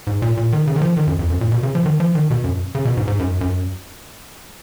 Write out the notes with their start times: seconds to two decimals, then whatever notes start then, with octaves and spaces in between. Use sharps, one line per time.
0.07 G#2
0.22 A#2
0.37 A#2
0.52 D#3
0.67 C#3
0.76 D#3
0.82 F3
0.97 D#3
1.07 F#2
1.19 F2
1.30 F#2
1.41 A#2
1.52 B2
1.63 C#3
1.75 F3
1.86 D#3
2.00 F3
2.15 D#3
2.30 B2
2.44 F#2
2.75 C#3
2.85 B2
2.97 G#2
3.07 G#2
3.19 F#2
3.41 F#2